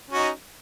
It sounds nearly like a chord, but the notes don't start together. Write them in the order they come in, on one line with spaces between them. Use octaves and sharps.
C#4 F#4 D#4